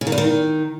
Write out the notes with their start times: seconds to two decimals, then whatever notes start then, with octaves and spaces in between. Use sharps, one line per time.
0.01 C#3
0.07 D#3
0.12 E2
0.18 D#3